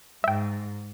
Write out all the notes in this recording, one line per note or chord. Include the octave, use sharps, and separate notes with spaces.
G#2 E5 G5